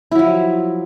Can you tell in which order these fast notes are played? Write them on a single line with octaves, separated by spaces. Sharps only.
E4 F#3 F3